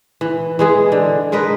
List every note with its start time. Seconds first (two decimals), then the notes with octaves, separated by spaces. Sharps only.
0.21 E3
0.59 E3 G#3 G#4
0.92 D3
1.32 G#3 A#4 B4 D#5